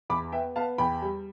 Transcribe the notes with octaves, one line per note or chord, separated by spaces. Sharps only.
E2 B5 D6
B3 E5 G5
B3 F5 A5
E2 G5 B5
G3